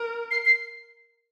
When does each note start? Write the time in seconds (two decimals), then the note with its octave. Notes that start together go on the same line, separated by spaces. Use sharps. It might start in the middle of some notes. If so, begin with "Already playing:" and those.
Already playing: A#4
0.31 C7
0.45 C7